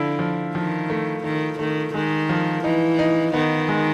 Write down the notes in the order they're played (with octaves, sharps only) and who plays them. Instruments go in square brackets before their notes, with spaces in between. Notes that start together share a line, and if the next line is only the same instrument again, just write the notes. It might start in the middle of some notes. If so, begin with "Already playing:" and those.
Already playing: [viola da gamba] D3 [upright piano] F3 E4
[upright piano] F3
[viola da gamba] D#3 [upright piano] F3
[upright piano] A3
[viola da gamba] D#3 [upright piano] A3
[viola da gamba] D#3 [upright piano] A3
[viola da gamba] D#3 [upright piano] G#3
[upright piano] F3
[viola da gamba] E3 [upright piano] D#4
[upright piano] D#4
[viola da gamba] D#3 [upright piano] B3
[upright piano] G#3